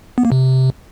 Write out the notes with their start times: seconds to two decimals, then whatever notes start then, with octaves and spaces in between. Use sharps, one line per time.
0.18 B3
0.25 A#3
0.32 C3